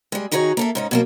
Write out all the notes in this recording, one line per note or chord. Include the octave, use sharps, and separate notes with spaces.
G3 G#3
D#3 D#4 E4 F#4 G#4 C#5
A#3 A4 E5
G#2 C#4 D#4
B2 F#3 A#3